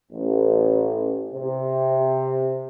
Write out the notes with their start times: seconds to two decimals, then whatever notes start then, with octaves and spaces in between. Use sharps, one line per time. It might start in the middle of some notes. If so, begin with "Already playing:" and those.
0.12 A1
1.33 C3